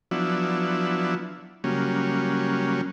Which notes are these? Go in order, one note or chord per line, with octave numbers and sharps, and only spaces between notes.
F3 F#3 B3 D4 E4
C#3 F#3 G3 A#3 C#4